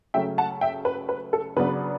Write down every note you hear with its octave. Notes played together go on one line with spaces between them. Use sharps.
C#3 F#3 A3 C#4 E5 G5
F#5 A5
E5 G5
B4
B4
A4
C#3 F#3 B3 D4 B4